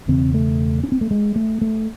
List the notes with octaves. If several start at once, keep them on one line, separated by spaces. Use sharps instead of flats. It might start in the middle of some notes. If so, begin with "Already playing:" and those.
E1 E2 C#3 C4
A3
C#4
C4
A3
G#3
A3
A3